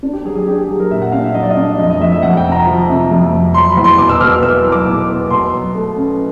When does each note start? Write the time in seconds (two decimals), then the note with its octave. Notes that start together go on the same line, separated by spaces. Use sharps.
0.03 D4
0.13 G4
0.25 F#3 G#4
0.35 G#4
0.47 D4 G4
0.58 G#4
0.69 F#3
0.80 A#4
0.91 A#2 E5
1.02 F#5
1.12 D4 F5
1.24 E5
1.34 F#3 D#5
1.43 D5
1.50 D#5
1.57 D4
1.79 F2 D#5
1.90 D#5
2.01 F2 E5
2.12 E5
2.23 F2 F#5
2.37 G5
2.44 C3
2.52 A#5
2.67 F3
2.89 C3
3.11 F2
3.33 F2
3.54 F#3 C6
3.69 B5
3.77 E2
3.84 C6
3.98 B2 D6
4.09 E6
4.20 B2 F6
4.32 E6
4.42 B3 E6
4.64 F#3
4.72 D6
4.86 B2
5.08 B3
5.30 B2 C6
5.53 F#3
5.75 A3
5.96 C#4